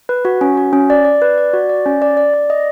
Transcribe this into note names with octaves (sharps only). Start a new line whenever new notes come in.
B4
F#4
C#4
F#4
C#4
D5
D5
B4
D5
F#4
D5
C#4
D5
D5
D5
D#5